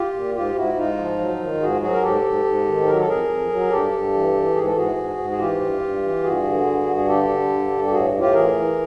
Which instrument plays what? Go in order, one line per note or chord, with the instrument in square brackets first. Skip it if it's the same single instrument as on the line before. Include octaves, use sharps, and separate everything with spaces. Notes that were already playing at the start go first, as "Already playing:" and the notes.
Already playing: [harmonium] F4 G4
A#2
G#2 F4 G4
G#2 E4 F#4
G#2 D#4 F4
F3
F#3
D#3
G#2 F#4 G#4
F#3 F#4 G#4
A#4
G#2 G4 A4
G#2
G#2
D#3
F#3 A#4
A4
F2 G#4 A#4
F2
F#3
G2 G4 A4
G2
E3
E3
G#2 G#4
A4
G#2 F#4 G#4
G#2
G#2
G#4
E3 F4 G4
G2
G2
E3
G2 F#4 G#4
D3
G2
G2
G#4
D3 G4 A4
D3
G2
G2
G4
A2 F#4 G#4
A2
F4 G4
E3 G#4 A#4
E3